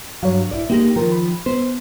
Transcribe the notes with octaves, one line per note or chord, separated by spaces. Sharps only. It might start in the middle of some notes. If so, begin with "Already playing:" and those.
G2 F#3 C#5 F5
A#1 E4 D5
G#3 A#3 D#4 G4 A#6
D#3 F3 A#4 G5 A#5
B5
B3 C5